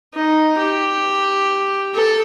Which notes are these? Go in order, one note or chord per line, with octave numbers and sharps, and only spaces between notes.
D#4
G4
A4